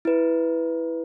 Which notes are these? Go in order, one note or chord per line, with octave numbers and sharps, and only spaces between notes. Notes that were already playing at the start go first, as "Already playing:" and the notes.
E4 B4